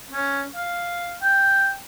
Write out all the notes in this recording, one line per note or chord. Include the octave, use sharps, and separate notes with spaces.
C#4
F5
G5